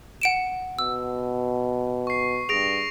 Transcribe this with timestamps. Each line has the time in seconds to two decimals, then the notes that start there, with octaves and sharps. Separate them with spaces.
0.22 F#5 D7 E7
0.79 B2 E6
2.07 C#6 C7
2.49 G2 G#4 A#6 D7 F7